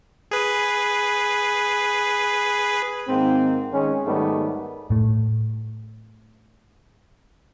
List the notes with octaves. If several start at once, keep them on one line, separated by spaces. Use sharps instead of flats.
G#4 B4
G#2 D#3 A#3 C4
D#3 G#3 C#4
G#2 D#3 G3 A3 B3
A2 A3